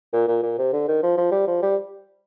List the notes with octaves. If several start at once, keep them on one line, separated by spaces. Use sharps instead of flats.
A#2
A#2
A#2
C3
D3
D#3
F3
F3
G3
F3
G3